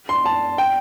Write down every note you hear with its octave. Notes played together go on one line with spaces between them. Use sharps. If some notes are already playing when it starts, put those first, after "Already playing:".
C6
A5
G5